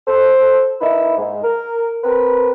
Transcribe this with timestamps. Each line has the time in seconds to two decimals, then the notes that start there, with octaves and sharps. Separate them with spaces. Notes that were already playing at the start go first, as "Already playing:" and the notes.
0.08 A4 C5
0.80 A#3 D#4 E4 B4 E5
1.17 G#2
1.43 A#4
2.04 C4 A#4 B4